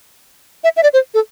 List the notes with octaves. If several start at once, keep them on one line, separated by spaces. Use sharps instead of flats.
E5
E5
D5
C5
A4